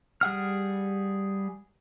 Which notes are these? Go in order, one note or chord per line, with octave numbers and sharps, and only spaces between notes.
G3 G#4 F#5 F6